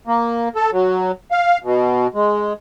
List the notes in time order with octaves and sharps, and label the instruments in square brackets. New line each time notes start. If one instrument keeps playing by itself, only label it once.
[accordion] A#3
A4
F#3
F5
B2
G#3